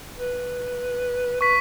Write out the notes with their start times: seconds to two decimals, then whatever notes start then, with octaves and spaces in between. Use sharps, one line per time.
0.17 B4
1.41 B4 C#6 B6